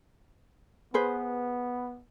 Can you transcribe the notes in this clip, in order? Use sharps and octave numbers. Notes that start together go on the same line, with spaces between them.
B3 G#4 B4 C5